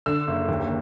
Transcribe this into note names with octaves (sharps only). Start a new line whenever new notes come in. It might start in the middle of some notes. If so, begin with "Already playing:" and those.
D3 E6
F#1
D#2